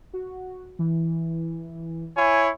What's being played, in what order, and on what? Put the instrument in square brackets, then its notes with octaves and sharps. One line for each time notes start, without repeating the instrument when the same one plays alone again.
[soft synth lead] F#4
E3
[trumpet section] E4 C#5 G#5